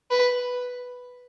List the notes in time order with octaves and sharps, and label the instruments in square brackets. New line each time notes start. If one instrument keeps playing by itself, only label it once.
[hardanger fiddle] B4